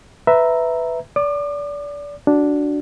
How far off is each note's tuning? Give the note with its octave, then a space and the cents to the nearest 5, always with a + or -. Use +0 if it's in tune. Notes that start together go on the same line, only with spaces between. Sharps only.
B4 +10 E5 +0 A#5 +0
D5 -25 D6 +40
D4 -5 F#4 +5